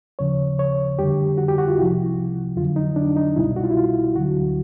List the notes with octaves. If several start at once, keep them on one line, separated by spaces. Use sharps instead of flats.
D#2 C#3 F3 C#5
C#5
F2 D3 G3 G4
F#4
G4
F#4
F4
C2 C3 F3 E4
F2 D3 F#3 F4
D#4
D4
D#4
C2 B2 G3 E4
F#4
F4
E4
F4
D2 D3 F#3 F#4